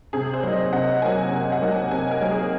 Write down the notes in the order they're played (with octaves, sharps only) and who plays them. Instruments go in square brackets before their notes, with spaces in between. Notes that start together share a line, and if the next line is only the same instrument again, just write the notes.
[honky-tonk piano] C3 G#4
C5
F#3 A#3 D#4
D#5
C3 F#5
F#3 A#3 D#4 G#5
C3
F#5
F#3 A#3 D#4
G#5
C3 G#5
A#4
F#3 A#3 D#4
G#4